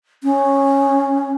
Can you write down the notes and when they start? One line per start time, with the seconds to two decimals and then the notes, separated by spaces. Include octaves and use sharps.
0.24 C#4